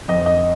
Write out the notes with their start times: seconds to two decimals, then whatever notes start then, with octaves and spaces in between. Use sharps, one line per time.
0.08 F2 D#5
0.26 D#5